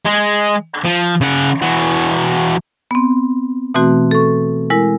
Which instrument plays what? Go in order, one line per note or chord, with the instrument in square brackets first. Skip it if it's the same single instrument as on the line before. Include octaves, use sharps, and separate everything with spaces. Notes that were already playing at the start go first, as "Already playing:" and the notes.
[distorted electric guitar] G#3
F3
C#3 F#5
E3 F#4
[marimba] B3 C4
B2 E3 A3 C4 F#4
A4 C#6
G#3 E4 A#4